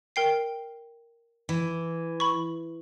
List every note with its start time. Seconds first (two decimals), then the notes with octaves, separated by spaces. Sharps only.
0.16 A#4 G5 C7
1.49 E3
2.20 B5 C#6